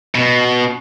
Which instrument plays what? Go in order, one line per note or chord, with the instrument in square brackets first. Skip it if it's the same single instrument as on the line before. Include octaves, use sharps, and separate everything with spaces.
[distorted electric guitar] B2